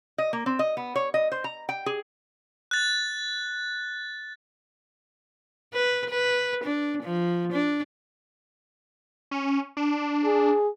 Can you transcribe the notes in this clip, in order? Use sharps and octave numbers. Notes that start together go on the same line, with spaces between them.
D#5
A#3
C4
D#5
B3
C#5
D#5
C5
A#5
G5
G#4
F#6 A6
B4
B4
D4
F3
D4
C#4
D4
G#4